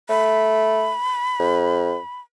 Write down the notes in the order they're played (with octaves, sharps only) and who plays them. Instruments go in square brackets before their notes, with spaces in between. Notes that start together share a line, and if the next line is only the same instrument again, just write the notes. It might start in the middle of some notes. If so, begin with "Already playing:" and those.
[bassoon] A3 [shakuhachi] B5
[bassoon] F2